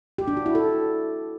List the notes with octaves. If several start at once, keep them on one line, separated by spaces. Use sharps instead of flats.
G4
D4
F#4
E4
A4